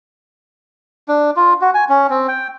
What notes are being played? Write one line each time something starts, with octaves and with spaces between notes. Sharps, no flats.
D4
F4
F#4
G#5
C#4
C4
G5